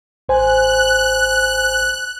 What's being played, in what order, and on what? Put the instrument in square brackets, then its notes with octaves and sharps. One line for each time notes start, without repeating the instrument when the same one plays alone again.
[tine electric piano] A1 C5 G#5 [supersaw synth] F#6